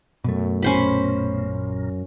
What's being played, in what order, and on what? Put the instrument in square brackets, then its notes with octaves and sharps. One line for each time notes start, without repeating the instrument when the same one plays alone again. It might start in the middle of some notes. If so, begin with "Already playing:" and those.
[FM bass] F#2 [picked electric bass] B2 A3
[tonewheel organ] A#1 A#2 [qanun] C#4 C5 B5